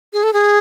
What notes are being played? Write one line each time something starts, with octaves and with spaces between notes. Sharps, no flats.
G#4
A4
G#4